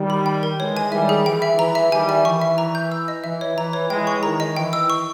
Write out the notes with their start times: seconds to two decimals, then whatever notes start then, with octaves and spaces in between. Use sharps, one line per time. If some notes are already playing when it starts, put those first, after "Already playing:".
Already playing: D#3 G3
0.10 B5
0.26 G5
0.43 A#4
0.60 E3 G#3 C#5
0.77 G#5
0.92 D#3 G3 E5
1.09 G#4
1.26 E3 G5
1.42 E5
1.58 E3 A#5
1.75 E5
1.92 D#3 G3 G#5
2.09 E5
2.25 E3 C#6
2.42 E5
2.58 A#5
2.75 G6
2.92 E6
3.08 D#5
3.24 E3 E5
3.41 C#5
3.57 E3 A#5
3.73 C#5
3.90 E3 G#3 G5
4.07 C#6
4.23 D#3 A#5
4.40 D#5
4.57 E3 G5
4.73 E6
4.90 C#6